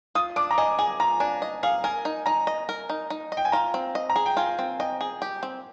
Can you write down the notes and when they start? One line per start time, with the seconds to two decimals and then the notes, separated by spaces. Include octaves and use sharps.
0.15 F4 D#6
0.36 D4 D6
0.51 A#5
0.58 D#5 G#5
0.79 G#4 G#5
1.00 F4 A#5
1.20 D4 G#5
1.42 D#5
1.63 G#4 F5
1.84 A#4 G#5
2.05 D#4
2.26 D#4 A#5
2.47 D#5
2.69 A#4
2.90 D#4
3.10 D#4
3.32 D#5
3.37 G5
3.45 G#5
3.52 F4 A#5
3.74 C4
3.95 D#5
4.10 A#5
4.16 G#4
4.26 G5
4.37 F4 G#5
4.59 C4
4.80 D#5 G5
5.01 G#4
5.22 G4
5.43 C4